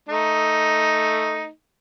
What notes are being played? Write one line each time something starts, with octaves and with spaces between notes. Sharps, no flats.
A3 D#4